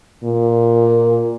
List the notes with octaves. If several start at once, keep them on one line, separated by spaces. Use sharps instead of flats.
A#2